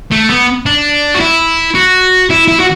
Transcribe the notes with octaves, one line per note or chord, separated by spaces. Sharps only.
A3
B3
D4
F#4
E4
F#4
E4
E4
F#4